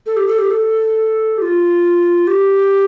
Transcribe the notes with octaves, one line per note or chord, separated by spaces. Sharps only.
A4
G4
A4
G4
A4
G4
F4
G4